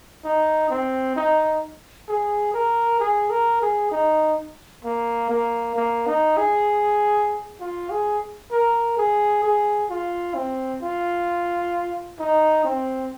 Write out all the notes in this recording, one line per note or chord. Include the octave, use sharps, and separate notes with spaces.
D#4
C4
D#4
G#4
A#4
G#4
A#4
G#4
D#4
A#3
A#3
A#3
D#4
G#4
F4
G#4
A#4
G#4
G#4
F4
C4
F4
D#4
C4